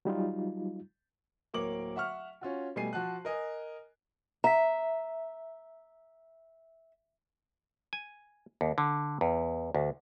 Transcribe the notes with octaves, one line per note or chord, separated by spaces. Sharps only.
F#3 G3 D#4 F4
D1 A#3 A#4 C#5 D6 F#7
E5 F#5 C#6 F6
C#4 F4 F#4
B2 G3 A3 G#5 C7 D#7
F3 F#4 A5 F#6
A#4 D#5 G#5
E5 A#5 B6
G#5
D#2
D3
E2
D2